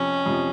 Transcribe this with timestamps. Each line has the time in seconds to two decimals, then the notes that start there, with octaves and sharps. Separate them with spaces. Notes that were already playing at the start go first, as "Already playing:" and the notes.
Already playing: F2 C3 F3 C#4
0.26 F2 C3 F3